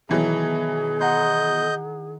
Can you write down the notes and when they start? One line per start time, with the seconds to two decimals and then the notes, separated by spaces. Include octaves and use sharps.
0.09 B2 D#3 E3 F#3 E4 G#4
1.00 D#5 F#5 A#5 C6 G6